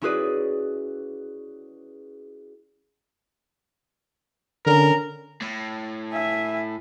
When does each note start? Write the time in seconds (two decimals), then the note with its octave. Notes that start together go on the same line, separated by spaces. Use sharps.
0.02 C#4 E4 F#4 G#4 B4 D5
4.66 D3 C#4 A#4
5.41 A2
6.12 E5 G#5